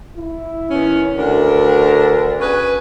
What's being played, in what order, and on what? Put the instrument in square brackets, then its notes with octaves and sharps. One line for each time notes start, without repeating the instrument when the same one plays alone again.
[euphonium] E4
[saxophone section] D#3 B3 C#4
[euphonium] D2 [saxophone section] D4 A#4
[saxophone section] C#4 G#4 B4